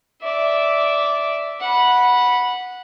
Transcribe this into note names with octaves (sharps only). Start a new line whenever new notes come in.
D5 E5
F#5 B5